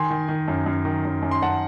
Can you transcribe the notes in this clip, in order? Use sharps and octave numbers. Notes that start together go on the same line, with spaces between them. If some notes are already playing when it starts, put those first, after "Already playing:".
Already playing: D#3 G#5 C6
D#3
D#3
F#2
F#2
D#3
F#2
F#2
C6
F#2 F#5 A5